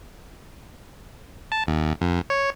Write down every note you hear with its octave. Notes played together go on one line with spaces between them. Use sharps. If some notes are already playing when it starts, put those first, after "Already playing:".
A5
D#2
F2
C#5